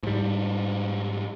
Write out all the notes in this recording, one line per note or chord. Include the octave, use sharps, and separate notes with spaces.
G#2 G3